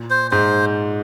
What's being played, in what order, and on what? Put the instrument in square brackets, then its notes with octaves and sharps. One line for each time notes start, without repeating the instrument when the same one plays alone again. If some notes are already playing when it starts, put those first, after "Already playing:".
Already playing: [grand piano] A#2
[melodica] C5
[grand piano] G#2 [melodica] C5